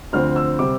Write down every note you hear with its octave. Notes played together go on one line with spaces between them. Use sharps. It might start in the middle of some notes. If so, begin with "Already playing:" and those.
D2 D3 F3 C4 F6
E6
C3 G3 C4 D6